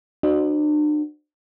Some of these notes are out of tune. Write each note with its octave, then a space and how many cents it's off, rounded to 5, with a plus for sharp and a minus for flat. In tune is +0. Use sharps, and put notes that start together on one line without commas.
D4 +40 F#4 +0 C5 +0